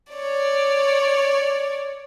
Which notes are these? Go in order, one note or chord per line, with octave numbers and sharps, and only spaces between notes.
C#5 D5